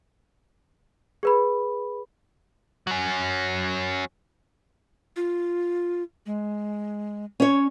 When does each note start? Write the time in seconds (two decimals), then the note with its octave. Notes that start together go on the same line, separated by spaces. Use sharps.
1.23 G#4 B4 B5
2.87 F#3 C#4
5.16 F4
6.26 G#3
7.40 C#4 C#5